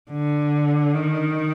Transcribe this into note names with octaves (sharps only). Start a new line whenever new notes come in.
D3
D#3